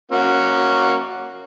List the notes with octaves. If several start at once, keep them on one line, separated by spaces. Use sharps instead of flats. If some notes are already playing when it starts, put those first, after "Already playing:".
A#3 C#4 F#4